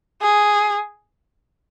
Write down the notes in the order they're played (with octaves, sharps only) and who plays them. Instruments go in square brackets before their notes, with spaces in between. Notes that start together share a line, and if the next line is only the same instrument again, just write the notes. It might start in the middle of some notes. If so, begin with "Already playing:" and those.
[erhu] G#4